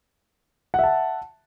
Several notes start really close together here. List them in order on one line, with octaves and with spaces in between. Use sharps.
F#5 E5 A5